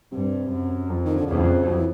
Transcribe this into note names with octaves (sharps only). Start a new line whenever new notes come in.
G2 C3
F#2
F2
D#3
D3
F2 C#3
F#3
E3